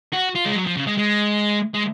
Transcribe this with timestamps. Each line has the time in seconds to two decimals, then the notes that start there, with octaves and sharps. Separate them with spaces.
0.13 F#4
0.35 F4
0.45 G#3
0.55 F#3
0.66 F3
0.76 C#3
0.87 G#3
0.98 G#3
1.75 G#3